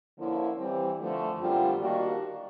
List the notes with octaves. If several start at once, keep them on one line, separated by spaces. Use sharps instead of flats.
D3 F3 A#3 C#4 E4
E3 G3 C4
D3 F3 A3
F#2 D3 G3 C4 F4
D#3 G3 A#3 D4 F#4